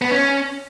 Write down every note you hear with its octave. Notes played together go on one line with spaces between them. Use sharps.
B3
C#4